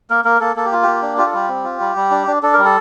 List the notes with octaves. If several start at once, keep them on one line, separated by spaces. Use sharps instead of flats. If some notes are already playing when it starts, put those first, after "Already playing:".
A#3 A#4
A#3 A#4
A#3 A4
A#3 A4
G4
F4
A#3 G4
D4
F4 G4
A4
G3 G4
C4
F4
G3
G3
D4
D4
D4 A4
A#4
G3
A4